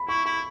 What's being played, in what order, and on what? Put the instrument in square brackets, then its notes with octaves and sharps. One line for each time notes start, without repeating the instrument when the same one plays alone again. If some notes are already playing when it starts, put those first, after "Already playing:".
Already playing: [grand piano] B5
[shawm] E4 [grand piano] C#6
[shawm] E4 [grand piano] B5